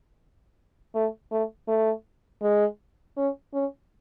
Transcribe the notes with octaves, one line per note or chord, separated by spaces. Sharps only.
A3
A3
A3
G#3
C#4
C#4